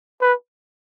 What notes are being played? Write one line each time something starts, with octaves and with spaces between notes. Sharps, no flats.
B4